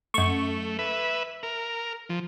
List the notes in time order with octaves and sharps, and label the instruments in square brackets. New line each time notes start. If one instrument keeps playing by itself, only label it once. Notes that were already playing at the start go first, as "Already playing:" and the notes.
[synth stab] F#2 C#6 [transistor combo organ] A3
[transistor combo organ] B4 E5
A#4
F3